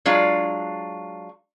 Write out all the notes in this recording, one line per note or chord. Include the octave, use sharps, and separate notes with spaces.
F#3 G#3 D4 F4